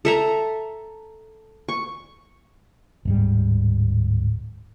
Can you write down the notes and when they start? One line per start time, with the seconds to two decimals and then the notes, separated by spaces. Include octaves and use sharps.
0.05 A4 E5 A#5
1.69 C#6
3.05 D1 G#2 G3